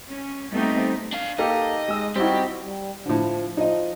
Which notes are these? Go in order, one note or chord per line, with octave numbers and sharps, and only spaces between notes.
C#4
G3 A3 B3 C4 D#4 G4
D4 F5
A#3 D#4 G4 A4 D#5 F5
G#3 E6
G3 C4 D#4 E4 F#4 G4
G3
A2 D3 F3
F3 D#4 D#5